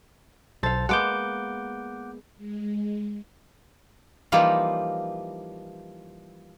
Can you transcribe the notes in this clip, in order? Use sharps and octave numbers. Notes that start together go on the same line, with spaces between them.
B1 A4 C5 F5 A6
G#3 A#3 B3 F#5 D6 G6
G#3
E3 F3 G3 A#3 D#4 F4